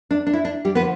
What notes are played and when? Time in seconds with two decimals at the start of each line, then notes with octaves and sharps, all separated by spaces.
0.11 D4
0.27 D4
0.33 E4
0.45 D4
0.65 G3 G4
0.75 D3 F3 B3 B4